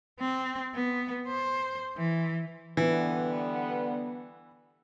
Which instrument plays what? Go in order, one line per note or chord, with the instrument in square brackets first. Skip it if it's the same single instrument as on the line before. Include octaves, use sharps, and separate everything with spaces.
[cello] C4
B3
C5
E3
[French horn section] D3 G3 B3 [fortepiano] E3